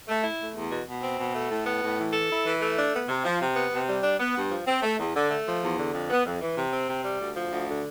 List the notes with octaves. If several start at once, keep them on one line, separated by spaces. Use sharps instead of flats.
A3
E4
A3
E2
B2
B2
C4
B2
A3
A2
B3
A2
E3
A4
E4
E3
A3
D4
B3
C3
F3
C3
B3
C3
G3
D4
B3
G2
F3
C4
A3
E2
D3
A3
F3
E2
D3
F2
B3
F2
E3
C3
C4
C3
G3
D2
F3
D2
D3